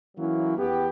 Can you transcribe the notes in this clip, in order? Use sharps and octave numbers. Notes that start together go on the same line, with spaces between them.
E3 F#3 A#3 C#4 E4
E2 B3 G4